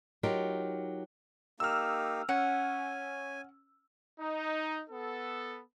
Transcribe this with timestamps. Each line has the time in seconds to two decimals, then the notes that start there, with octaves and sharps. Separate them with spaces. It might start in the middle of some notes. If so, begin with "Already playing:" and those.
0.23 F#3 D#4 F4 G4 A#4
1.60 A#3 D#4 G4 E6 F6
2.29 C#4 F#5 G#5
4.20 D#4
4.90 B3 A4